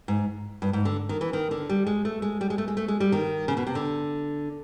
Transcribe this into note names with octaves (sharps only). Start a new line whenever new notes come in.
G#2
G2
G#2
D3
D#3
E3
D#3
D3
G3
G#3
A3
G#3
G3
G#3
A3
G#3
A3
G#3
G3
D#3
C#3
B2
C3
D3